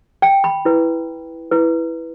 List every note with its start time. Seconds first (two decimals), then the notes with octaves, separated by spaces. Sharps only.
0.22 G5
0.44 B5
0.65 E4 B4
1.51 E4 B4